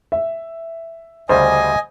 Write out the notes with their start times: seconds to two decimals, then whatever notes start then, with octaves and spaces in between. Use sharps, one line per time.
0.12 E5
1.29 D2 C#3 G3 C5 D#5 G#5